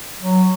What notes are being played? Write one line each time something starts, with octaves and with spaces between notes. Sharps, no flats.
F#3